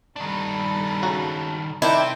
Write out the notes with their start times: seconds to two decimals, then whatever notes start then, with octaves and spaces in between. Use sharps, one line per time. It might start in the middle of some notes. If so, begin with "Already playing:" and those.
0.16 G2 D#3 D4 A4 B5
1.02 C#3 F#4 A#5
1.82 C3 D#3 D4 E4 G5 D6 G6